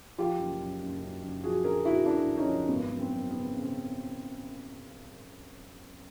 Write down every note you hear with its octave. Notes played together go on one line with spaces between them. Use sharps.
F3 F4 G4
F#1
F#2
F#1
F#2
F#1
F3 F#4 G#4
D3 G#4 A#4
D3 E4 F#4
D3 D4 E4
D3
C#4 D#4
F3
G#1 B3
F#2
C4
F#2
C#3 B3
C#3
C4